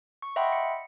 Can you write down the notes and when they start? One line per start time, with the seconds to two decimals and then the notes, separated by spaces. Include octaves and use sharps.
0.22 C#6
0.36 D#5 E5 F#5 G5 B5 C6
0.53 C#7